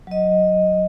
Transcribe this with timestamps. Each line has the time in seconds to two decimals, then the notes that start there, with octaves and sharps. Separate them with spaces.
0.07 F#3 D#5